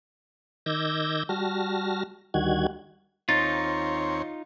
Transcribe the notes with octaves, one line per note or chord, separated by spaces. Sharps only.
D#3 D6 E6 G6 G#6 A#6
G3 F#4 A5 F6 A#6
D2 D#3 G3 F#4 F#5 G#6
D#2 C4 D#4 F4 C#5 A6